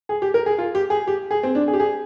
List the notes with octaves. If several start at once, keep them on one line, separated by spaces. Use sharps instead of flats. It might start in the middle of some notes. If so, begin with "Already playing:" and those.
G#4
G4
A#4
G#4
F4
G4
G#4
G4
G#4
C4
D4
G#4
G4
G#4